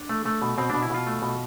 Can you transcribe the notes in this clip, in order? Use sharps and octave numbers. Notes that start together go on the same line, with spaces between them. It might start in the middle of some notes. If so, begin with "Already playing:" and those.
Already playing: D4
A3
A3
B2
B2 C4
B2 D4
E4
B2 F4
A3
B2